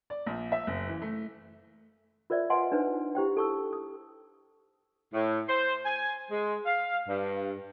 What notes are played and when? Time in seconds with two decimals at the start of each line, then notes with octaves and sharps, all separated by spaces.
0.10 D5
0.26 A#1
0.52 E5
0.67 F#1
0.88 E3
1.02 A3
2.30 F4 A#4 C5 D5 E5
2.50 B4 D#5 F#5 G#5 C6
2.72 D4 D#4 B4 C5
3.15 E4 G4 C5 G5
3.37 A4 A5 C#6 D#6 E6
3.73 D#6
5.14 A2
5.48 C5
5.86 G#5
6.31 G#3
6.66 F5
7.09 G2